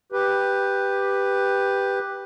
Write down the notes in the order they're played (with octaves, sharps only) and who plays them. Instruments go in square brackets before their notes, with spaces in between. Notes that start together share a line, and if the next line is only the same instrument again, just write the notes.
[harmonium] G4 B4